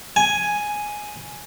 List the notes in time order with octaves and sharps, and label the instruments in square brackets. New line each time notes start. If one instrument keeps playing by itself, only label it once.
[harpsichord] G#5